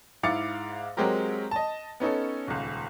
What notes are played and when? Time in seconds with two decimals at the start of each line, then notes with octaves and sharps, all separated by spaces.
0.23 G#2 E4 F5 D6 A6 C#7
0.97 F#3 G#3 C4 G4 A#4
1.51 D#5 A5
2.00 B3 C#4 D#4 A4
2.47 D#1 C#2